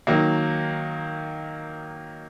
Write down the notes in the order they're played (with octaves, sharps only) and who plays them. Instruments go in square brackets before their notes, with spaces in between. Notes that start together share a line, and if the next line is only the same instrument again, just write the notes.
[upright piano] D#3 F#3 A#3